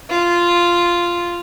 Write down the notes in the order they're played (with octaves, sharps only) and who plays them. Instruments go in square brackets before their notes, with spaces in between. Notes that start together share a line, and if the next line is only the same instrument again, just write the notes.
[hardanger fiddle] F4